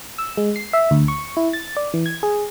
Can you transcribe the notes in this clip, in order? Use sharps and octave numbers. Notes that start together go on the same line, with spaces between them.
E6
G#3
C7
E5
D2
C#6
E4
A6
D5
E3
G#6
G#4